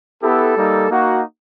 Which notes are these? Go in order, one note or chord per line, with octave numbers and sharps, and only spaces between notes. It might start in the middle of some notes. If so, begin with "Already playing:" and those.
B3 E4 G4 A4
G3 A#3 D#4
A#3 D#4 F#4